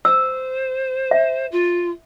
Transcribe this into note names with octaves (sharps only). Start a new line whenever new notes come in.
C5 E6
E5
F4